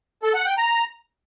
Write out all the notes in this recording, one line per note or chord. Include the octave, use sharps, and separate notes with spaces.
A4
F#5
G5
A#5